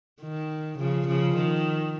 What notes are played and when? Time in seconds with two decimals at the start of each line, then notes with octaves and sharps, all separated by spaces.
0.21 D#3
0.79 C#3 F3
1.08 C#3 F3
1.36 D#3